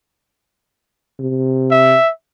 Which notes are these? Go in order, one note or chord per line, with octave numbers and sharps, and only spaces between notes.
C3
E5